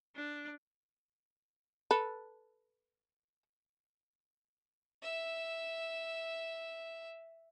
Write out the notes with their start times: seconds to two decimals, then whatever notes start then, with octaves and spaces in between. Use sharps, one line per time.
0.16 D4
1.91 A4 B4
5.02 E5 E6